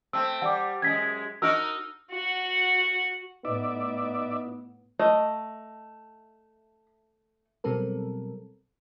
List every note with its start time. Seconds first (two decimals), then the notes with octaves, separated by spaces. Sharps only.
0.13 A3 C4 E6
0.42 G3 F#5 D6
0.82 F#2 G#3 G#6 B6
1.42 D#4 F#4 A#4 E6 F6
2.11 F#4 F#5
3.45 A2 B3 D#4 D5 E5
4.99 A3 D#5
7.64 B2 F#3 G3 C4 A4 A#4